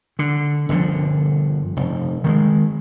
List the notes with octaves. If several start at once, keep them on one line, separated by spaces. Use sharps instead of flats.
D3
G1 D3 F3
F1
D#3 G3 G#3